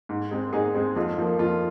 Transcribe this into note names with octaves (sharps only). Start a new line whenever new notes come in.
G#2
G#3 C4
G#2 D#4 G#4
G#3 C4
F2 F4
F3 A#3
F2 F4